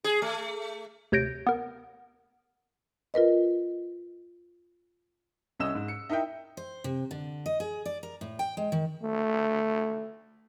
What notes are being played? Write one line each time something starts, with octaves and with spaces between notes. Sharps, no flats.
G#4
A3
D2 C3 C#5 G6 A#6 D7
B3 A#4
F4 A#4 B4 D#5
C2 C#4 D#5 E6 E7
G#2
C#7
D#4 E4 A#4 E5 G5
C5
C3
D3
D#5
G#4
D5
A#4
A2
G5
G#3
D#3
A3